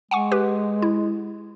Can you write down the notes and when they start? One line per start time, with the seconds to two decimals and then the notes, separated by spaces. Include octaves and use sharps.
0.11 G#3 F#5 G#5 C#6
0.32 G4 B4
0.82 E4